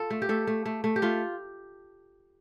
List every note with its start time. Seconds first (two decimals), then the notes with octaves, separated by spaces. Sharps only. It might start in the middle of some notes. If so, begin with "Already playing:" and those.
Already playing: F4 A4
0.10 A3
0.22 G4
0.29 A3 A4
0.47 A3
0.66 A3
0.84 A3
0.96 G4
1.02 A3 F4